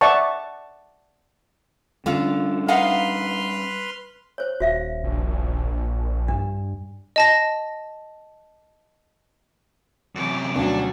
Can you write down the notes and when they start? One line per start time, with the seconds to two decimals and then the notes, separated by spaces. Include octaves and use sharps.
0.01 D5 E5 F#5 A5 C#6
2.06 D3 G3 C#4 D4 F4
2.68 D#4 B4 F5 F#5 C6 F6
4.38 C5 C#5
4.60 D#1 F#4 E5 F5
5.04 A#1
6.28 G2 D4
7.16 D#5 A5 A#6
10.15 F#2 C3 E3 D6
10.56 D2 B2 F#3 G3 C#4 D4 F5